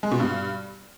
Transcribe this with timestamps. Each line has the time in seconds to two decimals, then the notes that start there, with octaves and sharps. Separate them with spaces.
0.03 G#3
0.11 B2
0.20 G2